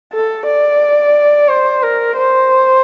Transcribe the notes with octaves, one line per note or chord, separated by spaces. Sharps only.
A4
D5
C5
A#4
C5